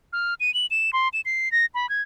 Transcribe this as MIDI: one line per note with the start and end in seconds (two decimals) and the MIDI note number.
0.13 0.34 89
0.40 0.53 99
0.54 0.66 102
0.71 0.91 100
0.93 1.09 84
1.13 1.21 100
1.25 1.51 96
1.52 1.66 94
1.74 1.89 83
1.89 2.02 92